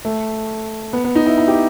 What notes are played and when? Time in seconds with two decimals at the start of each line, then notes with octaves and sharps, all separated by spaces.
0.05 A3
0.93 B3
1.04 B3
1.15 D#4
1.26 E4
1.38 E4
1.48 G4